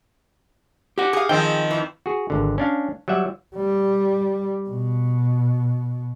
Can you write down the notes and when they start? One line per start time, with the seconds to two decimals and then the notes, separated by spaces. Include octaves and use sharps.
0.98 G4 F#5
1.13 G#4 F5
1.29 D#3 F3 C4 G5
1.71 F2 E3
2.06 F#4 G#4
2.30 G#1 D3
2.58 C#4 D4 F5
3.08 F#3 G3 E5 F#5
3.56 G3
4.70 B2